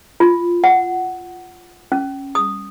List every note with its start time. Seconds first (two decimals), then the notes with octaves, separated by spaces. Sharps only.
0.20 F4
0.64 F#5
1.92 C#4
2.35 D#6